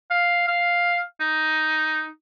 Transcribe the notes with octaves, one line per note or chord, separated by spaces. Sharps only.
F5
F5
D#4